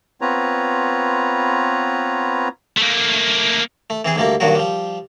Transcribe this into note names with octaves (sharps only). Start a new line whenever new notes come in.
B3 C4 F4 B4 C#5 A#5
A3 A#3
A3
E3 C4 G#4
D2 G3 A3 A#3
G2 A#2 D#3 F#3 F#4
F3 G3